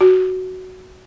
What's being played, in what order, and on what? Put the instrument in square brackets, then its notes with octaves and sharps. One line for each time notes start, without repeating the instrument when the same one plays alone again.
[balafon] F#4